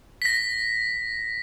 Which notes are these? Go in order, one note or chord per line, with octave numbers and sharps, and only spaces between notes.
A#6 B6